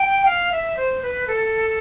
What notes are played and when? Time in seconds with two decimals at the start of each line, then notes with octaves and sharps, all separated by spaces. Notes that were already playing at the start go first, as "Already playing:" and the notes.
Already playing: G5
0.25 F5
0.51 E5
0.76 C5
1.02 B4
1.27 A4